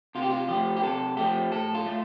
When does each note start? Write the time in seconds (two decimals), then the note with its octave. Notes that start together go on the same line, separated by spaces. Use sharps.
0.15 C3 F4
0.22 G4
0.30 F4
0.48 F3 A3 G4
0.77 G4
0.83 C3 A4
1.16 F3 A3 G4
1.51 A2 A4
1.74 F4
1.86 A3